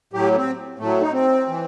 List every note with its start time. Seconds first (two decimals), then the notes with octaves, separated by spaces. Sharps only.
0.13 A2 F#3 G4
0.36 C4
0.79 A2 F#3 A3
1.01 D#4
1.12 C4
1.48 E3